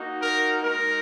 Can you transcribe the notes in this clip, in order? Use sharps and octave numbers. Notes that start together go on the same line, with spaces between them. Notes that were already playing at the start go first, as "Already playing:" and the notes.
Already playing: A#3 D#4 F#4
A#4
G#3 D#4 F#4 A#4